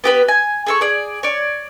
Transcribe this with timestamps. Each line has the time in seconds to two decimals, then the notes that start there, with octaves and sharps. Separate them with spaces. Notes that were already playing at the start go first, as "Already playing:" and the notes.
0.04 B3 G4 B4
0.28 G#5
0.66 G#4 A4 C#6
0.81 G#4 D5
1.23 C#5 D5